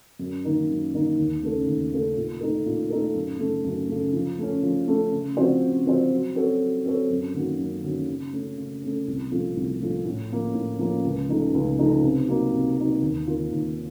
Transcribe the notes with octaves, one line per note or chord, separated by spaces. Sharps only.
F#2
D#3 A#3 D#4 A#4
F#2
D#3 A#3 D#4 A#4
D#2
C#3 A3 C#4 A4
D#2
C#3 A3 C#4 A4
A#2
A3 D#4 A4
A#2
A3 D#4 A4
F#2
C#3 A3
F#2
C#3 A3
F3
A3 C#4
F3
A3 C#4
C#3
F3 C4 F#4 C5
C#3
F3 C4 F#4 C5
F#3
C4 F#4 A4 C#5
F#3
C4 F#4 A4 C#5
F#2
D#3 A#3 C#4 F#4
F#2
D#3 A#3 C#4 F#4
C#3
A3 C#4
C#3
A3 C#4
C2
A#2 F3 A3
C2
A#2 F3 A3
A2
F3 A#3 C#4
A2
F3 A#3 C#4
C#2
C#3 F3 A3 D#4
C#2
C#3 F3 A3 D#4
C3
F#3 A#3 D#4
C3
F#3 A#3 D#4
D#2
D#3 A#3 F4 A#4
D#2